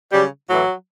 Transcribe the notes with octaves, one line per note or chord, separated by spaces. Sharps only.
C#3 F#3 G3
A2 E3 F#3